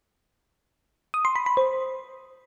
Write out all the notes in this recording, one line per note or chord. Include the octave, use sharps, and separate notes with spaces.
D#6
C6
B5
B5
C5